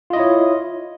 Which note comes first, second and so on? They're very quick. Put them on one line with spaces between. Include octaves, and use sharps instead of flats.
F4 D#5 E4 C#5